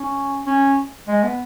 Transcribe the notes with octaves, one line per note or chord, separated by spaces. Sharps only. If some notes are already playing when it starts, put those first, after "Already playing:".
Already playing: C#4
C#4
G#3
B3